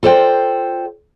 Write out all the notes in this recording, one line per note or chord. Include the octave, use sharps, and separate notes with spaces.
F4 A4 C5 D5 G5